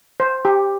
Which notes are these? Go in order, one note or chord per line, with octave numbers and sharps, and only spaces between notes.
C5
G4